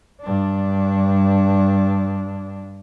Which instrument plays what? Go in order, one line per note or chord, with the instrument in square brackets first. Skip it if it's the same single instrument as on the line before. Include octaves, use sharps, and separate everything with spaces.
[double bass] G2 D4